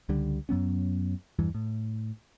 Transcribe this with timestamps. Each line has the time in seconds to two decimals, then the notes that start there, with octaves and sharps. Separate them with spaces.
0.09 C#2 D3 G3
0.49 F#2 F#3 B3 C#4
1.39 E2 G2 E3
1.55 A2